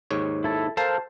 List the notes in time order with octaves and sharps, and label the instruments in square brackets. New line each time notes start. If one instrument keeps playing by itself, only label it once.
[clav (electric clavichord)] D#2 G#2 C#5
[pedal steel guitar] E4 A4
[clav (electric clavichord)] A4 A#4 F5 [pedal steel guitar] C5 A5